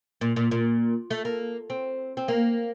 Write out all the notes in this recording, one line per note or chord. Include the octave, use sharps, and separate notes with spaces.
A#2
A#2
A#2
A3
A#3
C4
C4
A#3